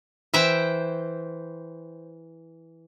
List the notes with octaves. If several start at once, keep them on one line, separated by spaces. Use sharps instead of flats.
E3 C5 E5 G5